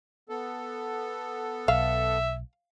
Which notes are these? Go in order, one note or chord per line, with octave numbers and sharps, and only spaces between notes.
B3 A4
B1 E5 F5